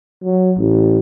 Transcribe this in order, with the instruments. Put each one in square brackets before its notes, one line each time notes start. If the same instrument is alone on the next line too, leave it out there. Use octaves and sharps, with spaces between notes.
[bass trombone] F#3
A1